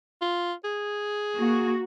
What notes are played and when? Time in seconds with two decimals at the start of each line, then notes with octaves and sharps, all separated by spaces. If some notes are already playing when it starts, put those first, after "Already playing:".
0.22 F4
0.64 G#4
1.36 A#3 F#4